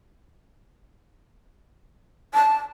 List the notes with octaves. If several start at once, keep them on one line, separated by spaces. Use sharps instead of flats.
A5